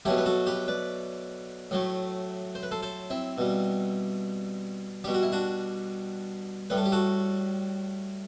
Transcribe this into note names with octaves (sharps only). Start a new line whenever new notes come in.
B2 F#3 A3 E4 G4
B4
F#4 A4
G4 B4
B4 D5
A2 F#3 A3
C5
B4
A4 C5
A4 C5
C4 E4
B2 G3
B2 G3 G4
F#4
E4
D4 F#4
A2 G3 B4
A4
G4
F#4 A4